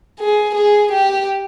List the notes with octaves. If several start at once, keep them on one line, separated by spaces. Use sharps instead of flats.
G#4
G#4
G4